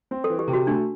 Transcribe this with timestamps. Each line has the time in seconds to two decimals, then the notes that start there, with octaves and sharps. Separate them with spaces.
0.11 C4
0.24 A4
0.30 E3
0.39 G4
0.48 C3
0.53 F#4
0.67 A3 D4